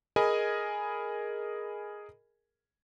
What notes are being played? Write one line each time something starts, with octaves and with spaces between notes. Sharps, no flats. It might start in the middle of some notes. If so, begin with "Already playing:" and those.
G#4 A#4 D#5 G#5 B5